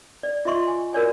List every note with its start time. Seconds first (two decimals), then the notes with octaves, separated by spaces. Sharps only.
0.23 D5
0.45 F4 D#5 E5 C6 C#6
0.67 G#5
0.93 F#4 A#4 C#5 D5 G#5